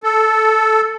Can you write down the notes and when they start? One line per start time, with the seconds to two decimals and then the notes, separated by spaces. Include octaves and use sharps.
0.03 A4